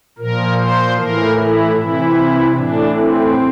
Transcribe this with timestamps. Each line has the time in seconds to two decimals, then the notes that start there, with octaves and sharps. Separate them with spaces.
0.18 A#2 F3 A#4
0.58 C5
0.97 A2 E3 A#4
1.36 E4
1.76 C3 E3 E4
2.55 A2 E3 D4
2.95 C4